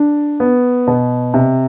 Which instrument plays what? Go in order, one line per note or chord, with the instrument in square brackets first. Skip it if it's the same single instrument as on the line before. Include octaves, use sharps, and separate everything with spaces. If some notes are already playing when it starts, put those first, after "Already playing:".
Already playing: [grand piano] D4
B3
B2
C3